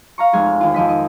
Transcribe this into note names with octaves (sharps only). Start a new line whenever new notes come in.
F5 A#5 C#6
F1 G#3 G#5 F6
D#2 F4
F2 F3 D#5 B6
D#5